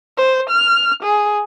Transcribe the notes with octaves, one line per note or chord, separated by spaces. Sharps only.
C5
F6
G#4